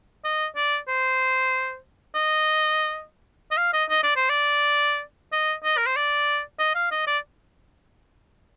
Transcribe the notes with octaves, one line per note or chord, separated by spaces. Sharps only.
D#5
D5
C5
D#5
D#5
F5
D#5
D#5
D5
C5
D5
D#5
D#5
A#4
C5
D5
D#5
F5
D#5
D5